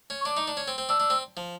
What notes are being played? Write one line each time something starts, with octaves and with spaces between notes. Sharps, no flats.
C#4
C#6
D4 D6
D#4
D4
C#4
C4
C4
D4 E6
D4
C4
F3